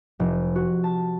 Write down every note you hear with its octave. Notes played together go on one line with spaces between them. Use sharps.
F1
F#4
A5